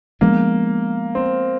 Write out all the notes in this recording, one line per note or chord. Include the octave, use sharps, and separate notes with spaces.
F3 G#3 A#3 B3 D4
C4